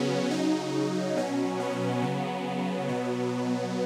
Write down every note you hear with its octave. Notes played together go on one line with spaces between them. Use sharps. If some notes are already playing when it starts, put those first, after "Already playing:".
Already playing: C#3 F#3 B3 C#4
C#3 F#3 D#4
B2 F#3 C#4
B3
C#3 F#3
B2 F#3